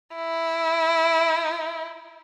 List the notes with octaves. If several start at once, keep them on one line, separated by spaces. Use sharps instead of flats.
E4